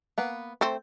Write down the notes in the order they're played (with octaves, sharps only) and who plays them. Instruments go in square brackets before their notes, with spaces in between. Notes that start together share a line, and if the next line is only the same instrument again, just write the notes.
[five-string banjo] A#3 B3 B4
[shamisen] A3 C4 [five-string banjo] C5